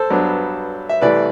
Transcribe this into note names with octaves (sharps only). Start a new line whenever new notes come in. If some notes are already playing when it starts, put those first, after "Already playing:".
Already playing: A4 C5
G2 F#3 B3 D4
E5
C2 C3 E3 A3 B4 D5